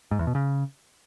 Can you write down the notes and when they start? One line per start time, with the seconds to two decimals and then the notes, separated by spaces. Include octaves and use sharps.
0.11 G#2
0.19 E2
0.27 B2
0.35 C#3